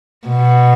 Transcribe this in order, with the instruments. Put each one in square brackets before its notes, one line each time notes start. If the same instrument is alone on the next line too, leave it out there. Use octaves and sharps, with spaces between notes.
[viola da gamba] B2